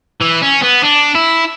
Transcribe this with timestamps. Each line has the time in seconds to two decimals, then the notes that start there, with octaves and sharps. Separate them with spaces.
0.21 E3
0.42 C#4
0.62 B3
0.83 D4
1.15 E4